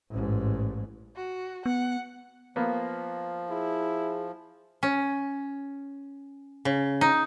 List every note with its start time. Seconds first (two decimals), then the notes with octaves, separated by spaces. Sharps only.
0.11 A1 G#2
1.16 F#4
1.66 B3 F#5
2.56 F3 A#3 B3
3.50 E4 G#4
4.83 C#4
6.65 C#3
7.01 D#4